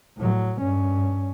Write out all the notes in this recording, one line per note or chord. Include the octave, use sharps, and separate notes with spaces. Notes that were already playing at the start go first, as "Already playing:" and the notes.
A2 F#3
G2 C#4